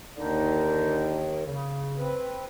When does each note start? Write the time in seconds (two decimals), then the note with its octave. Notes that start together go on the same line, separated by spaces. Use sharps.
0.17 D#2 D3 D#3 D4 D#4
1.45 C#3
1.98 C4 B4